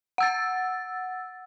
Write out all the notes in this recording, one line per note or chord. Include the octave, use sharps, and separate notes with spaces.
F#5 E6 A6